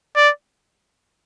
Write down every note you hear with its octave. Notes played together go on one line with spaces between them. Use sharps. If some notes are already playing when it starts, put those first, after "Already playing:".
D5